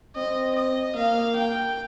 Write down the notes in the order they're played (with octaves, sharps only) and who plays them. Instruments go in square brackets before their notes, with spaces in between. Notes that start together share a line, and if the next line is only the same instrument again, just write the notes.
[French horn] C4 [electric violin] D#5
[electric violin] D#5
[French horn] A#3 [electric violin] F5
[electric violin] G5